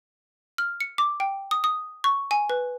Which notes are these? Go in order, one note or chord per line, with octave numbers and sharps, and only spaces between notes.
F6
C#7
D6
G5
D#6
D#6
C#6
G#5
B4